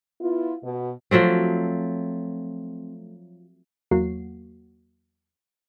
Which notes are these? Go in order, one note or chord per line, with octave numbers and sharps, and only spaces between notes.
B3 E4 F4
B2
F3 F#3 A3 C4
E2 F#3 A#3 F#4 C7